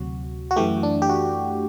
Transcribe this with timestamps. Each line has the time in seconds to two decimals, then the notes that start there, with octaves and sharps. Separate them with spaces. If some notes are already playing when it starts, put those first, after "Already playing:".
Already playing: D2 C3 F#3 F#4
0.51 F#4
0.56 F#2 E3 A3 G4
0.83 D4
1.02 G4
1.09 F#4